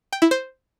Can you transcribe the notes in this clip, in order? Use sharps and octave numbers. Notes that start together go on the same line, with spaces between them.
G5
E4
C5